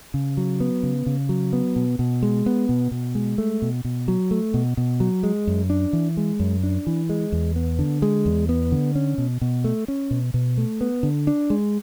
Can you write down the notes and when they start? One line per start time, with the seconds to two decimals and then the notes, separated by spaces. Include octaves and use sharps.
0.14 C#3
0.37 F#3
0.60 B3
0.83 C#3
1.06 C#3
1.29 F#3
1.53 B3
1.76 B2
1.99 B2
2.23 G#3
2.46 B3
2.69 B2
2.91 B2
3.15 G#3
3.38 A3
3.62 B2
3.85 B2
4.08 F#3
4.31 A3
4.54 B2
4.77 B2
5.00 F#3
5.23 G#3
5.47 F#2
5.70 D4
5.93 E3
6.17 G#3
6.40 F#2
6.63 D4
6.87 E3
7.09 G#3
7.32 E2
7.56 B3
7.79 D3
8.02 G#3
8.26 E2
8.49 B3
8.72 D3
8.95 C#4
9.18 B2
9.41 B2
9.64 A3
9.88 C#4
10.11 B2
10.34 B2
10.58 A3
10.81 B3
11.03 D3
11.27 D4
11.50 G#3